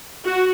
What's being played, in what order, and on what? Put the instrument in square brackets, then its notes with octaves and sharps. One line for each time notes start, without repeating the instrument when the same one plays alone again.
[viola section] F#4